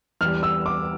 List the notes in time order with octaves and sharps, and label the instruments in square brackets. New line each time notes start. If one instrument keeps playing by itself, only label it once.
[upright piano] E2 E3 G3 F6
E6
D6